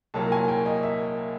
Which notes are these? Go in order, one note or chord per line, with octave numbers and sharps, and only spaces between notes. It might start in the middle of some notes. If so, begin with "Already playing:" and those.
C2 A#2 F#3 A#3 A5
G#5
G5
D#5
E5